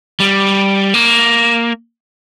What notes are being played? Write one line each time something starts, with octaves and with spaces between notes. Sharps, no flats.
G3
A#3